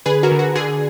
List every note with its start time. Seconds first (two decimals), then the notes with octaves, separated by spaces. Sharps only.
0.06 D3 G#4 B4
0.23 F#4 A#4
0.32 D3
0.39 F#4
0.55 D3 G#4